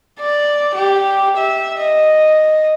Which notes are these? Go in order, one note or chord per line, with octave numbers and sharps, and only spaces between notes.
D5
G4
E5
D#5